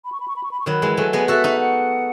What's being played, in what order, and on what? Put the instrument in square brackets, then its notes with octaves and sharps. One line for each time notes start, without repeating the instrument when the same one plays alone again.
[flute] B5
C#6
B5
C#6
B5
C#6
B5
C#6
[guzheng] D#3 F#3 [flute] B5
[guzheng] E3 G#3
[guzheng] F#3 A3 [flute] G#5
[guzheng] G#3 B3 [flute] G#5
[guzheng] F#4 A4 [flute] E5
[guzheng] D#4 F#4
[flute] F#5